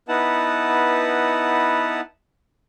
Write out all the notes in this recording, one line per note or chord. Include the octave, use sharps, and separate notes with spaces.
B3 D#4 E4 B4 F#5 A5